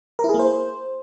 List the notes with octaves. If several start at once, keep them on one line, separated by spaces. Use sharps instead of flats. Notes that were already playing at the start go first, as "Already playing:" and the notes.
A#4
E4
G#4
A#3
C5